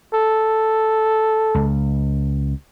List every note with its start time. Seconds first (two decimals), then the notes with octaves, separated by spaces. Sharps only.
0.14 A4
1.55 C#2